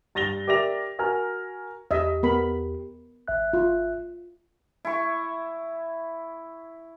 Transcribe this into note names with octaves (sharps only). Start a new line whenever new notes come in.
G2 A6 A#6 F7 G7
G4 A#4 D5 E5 A#6 F7
F#4 A#4 G#5 A#5 F6
E2 G4 D#5 E5
B3 A#4 B5
G#1 E5 F#6
F4
E4 C#6